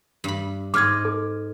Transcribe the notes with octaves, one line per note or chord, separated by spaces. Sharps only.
G2 B5
G#2 C4 D#5 D6 F6 G#6
A4